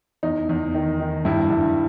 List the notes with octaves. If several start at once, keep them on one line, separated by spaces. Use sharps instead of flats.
E2 D#4
E2
D#3
D#3
G2 E4
G2